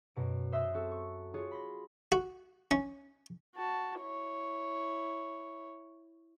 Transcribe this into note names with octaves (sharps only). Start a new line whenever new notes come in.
F#2 B2 D7
C5 E5 C6 D#6 F#6 A#6
C4 F#4 A4
C#6
F4 F#4 G#4 C#5
B5 C6 A#6
F#4
C#4
F#4 A5
E4 C#5